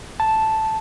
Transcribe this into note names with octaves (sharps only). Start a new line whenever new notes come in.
A5